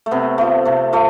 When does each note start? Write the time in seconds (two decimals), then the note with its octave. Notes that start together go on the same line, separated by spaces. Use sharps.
0.06 A3
0.11 C3 B3
0.38 F3 A3
0.65 C3 A3
0.93 F3 A3